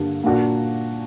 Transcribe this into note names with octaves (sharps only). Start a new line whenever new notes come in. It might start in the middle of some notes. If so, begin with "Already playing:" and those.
Already playing: G2 D3 G3 A#3
A#2 A#3 D4 F#4